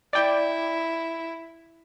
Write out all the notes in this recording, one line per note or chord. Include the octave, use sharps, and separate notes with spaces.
E4 D5 G5